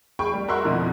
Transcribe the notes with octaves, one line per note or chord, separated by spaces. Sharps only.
G#4 G5 B5 C#6
G3
F#4 A#4 E5 C6 C#6 F#6
F2 B2 D3 F3